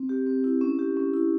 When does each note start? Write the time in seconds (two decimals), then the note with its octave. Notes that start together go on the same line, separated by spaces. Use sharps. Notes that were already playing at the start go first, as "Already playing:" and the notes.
Already playing: C4
0.09 G4
0.27 C4
0.44 E4
0.61 C#4
0.79 G4
0.97 C#4
1.14 E4